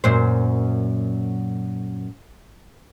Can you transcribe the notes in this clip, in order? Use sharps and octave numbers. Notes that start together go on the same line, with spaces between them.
F#2 A#2 C5